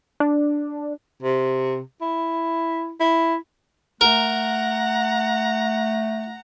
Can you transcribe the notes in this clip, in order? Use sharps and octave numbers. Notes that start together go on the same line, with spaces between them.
D4
C3
E4
E4
A3 A#4 F#5 A#5